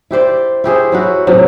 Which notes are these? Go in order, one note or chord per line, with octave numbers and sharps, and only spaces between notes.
E4 G4 C5 D5
E4 G4 G#4 C5
F#3 E4 F#4
A2 C3 F#3